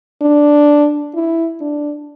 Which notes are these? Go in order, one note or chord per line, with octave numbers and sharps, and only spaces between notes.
D4
E4
D4